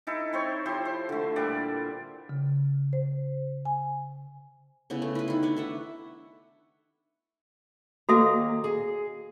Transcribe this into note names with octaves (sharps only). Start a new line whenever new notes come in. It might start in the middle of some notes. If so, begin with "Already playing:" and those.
D#4 E4 A4
C4 C5 C#5
F3 E4 G4 C5
C5
D3 A3
A#2 G3 D5 E5
C#3
C5
G#5
C#3 B3 E4
A3
E4 B4
D#3 E4
D4 B4 C#5
A4 E5 F#5
D#2 A#3 F#4 A4 E5 A#5
G#4